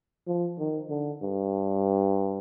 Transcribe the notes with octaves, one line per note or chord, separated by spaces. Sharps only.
F3
D#3
D3
G2